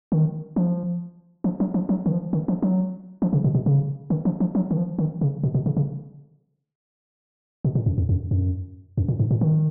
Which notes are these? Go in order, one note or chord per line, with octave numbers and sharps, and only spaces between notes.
D#3
F3
F3
F#3
F3
F#3
D#3
F3
D#3
F3
F#3
F3
C#3
B2
B2
C#3
D#3
F3
F3
F#3
D#3
F3
D#3
C#3
B2
B2
C#3
C#3
B2
A#2
F#2
F2
F#2
F#2
F#2
A#2
G#2
A#2
D#3